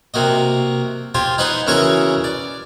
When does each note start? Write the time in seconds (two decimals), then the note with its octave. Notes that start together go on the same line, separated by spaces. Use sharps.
0.14 C3 A#3 F#4 D#5
1.15 F4 G4 C5 G#5
1.38 D#4 B4 C5 F#5 G#5
1.67 C#3 E3 F#4 A#4 C#5 C#6
2.24 D5